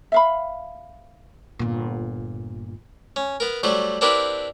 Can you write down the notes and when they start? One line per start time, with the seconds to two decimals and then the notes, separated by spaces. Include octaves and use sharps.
0.12 E5 F5 B5
1.59 G1 A#2
3.16 C#4
3.40 B3 A#4
3.63 F#3 G3 A3 F#4 C5
4.01 C4 D4 E4 G4 A#4 B4